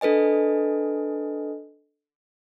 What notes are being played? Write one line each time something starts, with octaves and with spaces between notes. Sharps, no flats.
D4 A4 B4 D#5 G#5